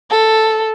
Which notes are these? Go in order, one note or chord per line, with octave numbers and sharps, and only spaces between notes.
A4